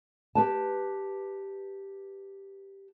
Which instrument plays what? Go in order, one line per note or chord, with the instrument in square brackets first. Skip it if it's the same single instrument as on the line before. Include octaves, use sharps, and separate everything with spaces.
[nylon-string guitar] G4 B4 A5